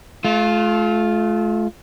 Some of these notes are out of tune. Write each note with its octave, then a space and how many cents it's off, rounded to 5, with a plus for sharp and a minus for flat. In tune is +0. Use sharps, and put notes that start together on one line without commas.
A3 -40 F4 +0